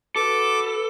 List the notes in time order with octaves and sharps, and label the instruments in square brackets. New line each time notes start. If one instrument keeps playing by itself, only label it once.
[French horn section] F#4 B4 [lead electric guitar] A4 [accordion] D6